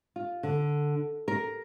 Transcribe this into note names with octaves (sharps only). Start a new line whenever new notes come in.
F4
D3
A#4